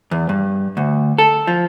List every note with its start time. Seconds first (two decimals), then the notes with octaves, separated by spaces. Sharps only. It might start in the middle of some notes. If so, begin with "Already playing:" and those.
0.11 E2
0.29 G2
0.77 D2
1.18 A4
1.47 F3